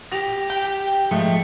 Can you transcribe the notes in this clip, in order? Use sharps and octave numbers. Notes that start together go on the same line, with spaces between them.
G4 A#6 F7
G5
G#2 F3 A3